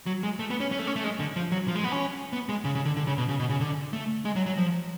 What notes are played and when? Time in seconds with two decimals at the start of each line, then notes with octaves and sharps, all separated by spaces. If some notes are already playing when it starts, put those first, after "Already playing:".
0.06 F#3
0.23 G#3
0.39 A3
0.50 B3
0.60 C#4
0.72 C#4
0.79 A3
0.87 C#4
0.96 A3
1.04 G#3
1.20 D3
1.36 F3
1.52 F#3
1.68 F3
1.75 G#3
1.84 B3
1.92 C#4
2.33 B3
2.49 G#3
2.65 C#3
2.75 C#3
2.85 D3
2.97 D3
3.07 C#3
3.18 B2
3.29 C#3
3.39 B2
3.50 C#3
3.60 D3
3.93 A3
4.25 G#3
4.36 F#3
4.46 F#3
4.58 F3